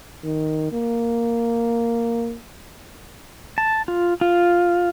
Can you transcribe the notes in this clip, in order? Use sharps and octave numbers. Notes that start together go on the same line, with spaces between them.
D#3
A#3
A5
F4
F4